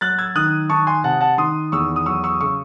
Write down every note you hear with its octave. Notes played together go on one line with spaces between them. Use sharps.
F#3 F#6 A6
E6 G#6
D#3 D#6 F#6
D#3 A5 C#6
G#5 C6
C3 F#5 A5
F#5 A5
D#3 C6 D#6
E2 C#6 E6
D#6
F#3 C#6 E6
C#6 E6
C#3 C#6 E6